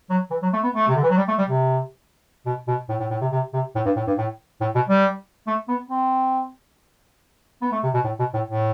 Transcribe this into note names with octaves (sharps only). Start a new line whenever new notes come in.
F#3
E3
F#3
A3
B3
A3
C3
D3
E3
F#3
G3
A3
G3
C3
B2
B2
A2
A2
A2
C3
C3
C3
A2
G2
A2
G2
A2
A2
B2
G3
A3
B3
C4
B3
A3
C3
B2
A2
B2
A2
A2